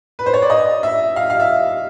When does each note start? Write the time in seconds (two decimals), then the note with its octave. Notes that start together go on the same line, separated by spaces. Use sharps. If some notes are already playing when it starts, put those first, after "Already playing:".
0.19 B4
0.26 C5
0.34 C#5
0.42 D5
0.50 D#5
0.83 E5
1.16 F5
1.30 F5
1.40 E5